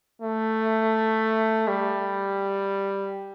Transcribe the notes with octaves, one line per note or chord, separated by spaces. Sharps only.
A3
G3